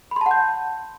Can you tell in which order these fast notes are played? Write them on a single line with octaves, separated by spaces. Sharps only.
B5 C6 A5 F#5 G6